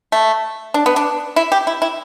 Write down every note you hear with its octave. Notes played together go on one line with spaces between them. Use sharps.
A3
D4
B3
D4
E4
G4
E4
E4